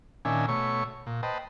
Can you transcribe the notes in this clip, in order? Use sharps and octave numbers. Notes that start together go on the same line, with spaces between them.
A#2 D#3 C#4 D4 E5 G#5
B2 A3 C#5 C#6
A#2
B4 C5 D#5 G5 A5